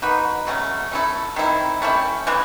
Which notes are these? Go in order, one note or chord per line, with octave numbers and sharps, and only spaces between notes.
A#3 D#4 F#4 B4
C#3 F#3 A3 C#4
A3 C#4 E4 A4
D#3 G3 C4 E4
A3 C#4 E4 G4
C#3 E3 G#3